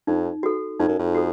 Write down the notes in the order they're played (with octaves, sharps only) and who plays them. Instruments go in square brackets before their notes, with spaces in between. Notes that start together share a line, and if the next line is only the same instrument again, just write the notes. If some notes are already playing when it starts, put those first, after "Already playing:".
[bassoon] F2 [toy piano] D#4
[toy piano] F#4 A4
[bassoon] F2 [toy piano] D#4
[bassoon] F#2
F2
[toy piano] F#4 A4